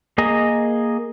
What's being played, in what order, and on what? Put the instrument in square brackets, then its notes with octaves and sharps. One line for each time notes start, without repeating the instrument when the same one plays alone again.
[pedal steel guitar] A#3 G#4 D#5 A#5